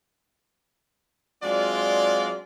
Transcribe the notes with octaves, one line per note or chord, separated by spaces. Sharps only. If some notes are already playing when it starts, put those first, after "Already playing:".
F#3 G#3 C4 D4 F4 D5